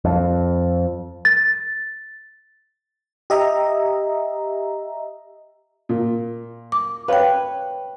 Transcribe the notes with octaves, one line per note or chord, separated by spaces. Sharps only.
F2
A6
G4 D#5 E5 A#5
A#2
D6
B4 C#5 F5 G5 F#6